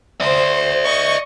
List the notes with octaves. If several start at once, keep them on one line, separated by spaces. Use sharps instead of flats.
C5 D5 E5
D#5 C#6